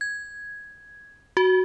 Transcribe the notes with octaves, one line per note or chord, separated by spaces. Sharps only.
G#6
F#4